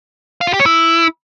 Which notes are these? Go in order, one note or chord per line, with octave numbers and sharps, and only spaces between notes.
F5
F4
G4
C#5
E4